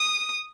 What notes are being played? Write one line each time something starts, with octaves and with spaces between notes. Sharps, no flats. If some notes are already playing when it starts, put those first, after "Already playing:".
Already playing: D#6